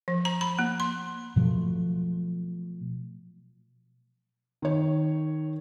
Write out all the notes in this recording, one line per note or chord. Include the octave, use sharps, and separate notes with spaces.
F3
A#5
B5
A#3
C6
B2 F3 F#3 A3
D#3 C#5